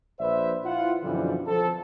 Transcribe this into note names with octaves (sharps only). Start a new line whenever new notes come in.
A#1 B4 C5 D5 E5
E4 F4 F#5
F#2 B2 D3 E3 F3 G3
F3 C4 A4